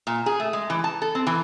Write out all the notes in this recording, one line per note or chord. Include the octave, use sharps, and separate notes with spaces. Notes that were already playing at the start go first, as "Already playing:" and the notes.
A#2
G#4
A3
G#3
E3
A5
A4
C4
E3